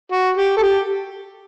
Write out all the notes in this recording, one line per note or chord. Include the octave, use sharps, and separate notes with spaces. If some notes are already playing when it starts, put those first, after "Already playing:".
F#4
G4
A4
G4